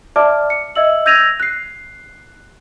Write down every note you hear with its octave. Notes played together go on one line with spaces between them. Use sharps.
D5 E5 A5 D6 F6
C#7
D#5 E5 E6 F#7
E6 G6 G#6 A#6 D#7 F7
F#6 C7